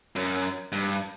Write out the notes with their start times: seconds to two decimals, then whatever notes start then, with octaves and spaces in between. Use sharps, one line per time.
0.16 F#2
0.72 G2